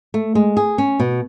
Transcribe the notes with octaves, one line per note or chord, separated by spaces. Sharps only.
A3
G#3
G#4
C#4
B2